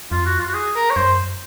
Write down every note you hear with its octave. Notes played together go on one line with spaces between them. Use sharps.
F2 F4
F#4
F4
F#4
G#4
A#4
C#5
F#2 C5